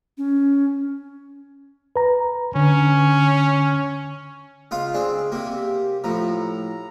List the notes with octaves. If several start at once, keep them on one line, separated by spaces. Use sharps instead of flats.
C#4
B4 A#5
D3 C#4
C#2 F4 F5
C4 D4 G#4
C3 A#3 G4
A2 F3 A#5